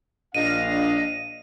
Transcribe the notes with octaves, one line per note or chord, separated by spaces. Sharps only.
A#1 D4 D#5 F5 D#7